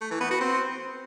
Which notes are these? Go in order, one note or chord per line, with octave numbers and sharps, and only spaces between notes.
A3
E3
B3
F#4
C4